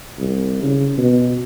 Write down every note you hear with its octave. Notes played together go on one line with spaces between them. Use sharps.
C2
C#3
B2